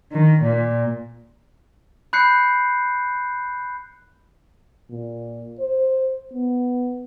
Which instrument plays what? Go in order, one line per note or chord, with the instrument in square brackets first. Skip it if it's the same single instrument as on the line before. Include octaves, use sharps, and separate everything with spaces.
[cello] D#3
A#2
[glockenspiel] B5 F#6 G6 C7 C#7
[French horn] A#2
C5
B3